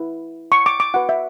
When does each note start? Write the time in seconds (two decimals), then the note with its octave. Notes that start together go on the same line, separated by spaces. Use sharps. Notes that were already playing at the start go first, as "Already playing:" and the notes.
Already playing: E4 B4
0.52 C#6
0.66 D6
0.80 D6
0.94 F#4 B4 F#5
1.09 E5